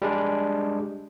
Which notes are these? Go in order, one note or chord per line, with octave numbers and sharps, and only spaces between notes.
G3 G#3 D4